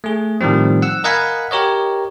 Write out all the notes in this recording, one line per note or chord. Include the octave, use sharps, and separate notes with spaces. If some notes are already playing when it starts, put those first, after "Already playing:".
A3 G#4
A2 D#3 F3 G3 C4
F#5 E6
A#4 D#5 F5 F#5 G#5 B5
G4 A#4 C#5 D#5